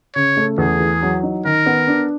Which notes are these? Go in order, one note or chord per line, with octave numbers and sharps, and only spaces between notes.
C#3 C#5
A3
E2 G#4
E3
F#3
D#4
D#3 A#4
B3
D4